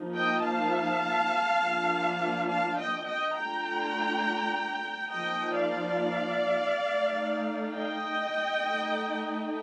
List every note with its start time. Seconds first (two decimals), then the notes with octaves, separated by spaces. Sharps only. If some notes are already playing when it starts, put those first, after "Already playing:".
Already playing: F3 A#3 D#4
0.16 D#5 G5
0.44 F5 A5
1.62 F3 A#3 D4 F4
2.49 F5 A5
2.78 D#5 G5
3.07 D#5 G5
3.36 A3 D4 F4 G5 A#5
5.12 F3 A#3 D#4 D#5 G5
5.56 D5 F5
6.88 A3 D#4
7.74 D#5 G5
8.63 A3 D#4